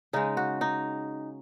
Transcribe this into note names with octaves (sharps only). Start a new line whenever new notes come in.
C#3 G#3 D#4
F#4
D#4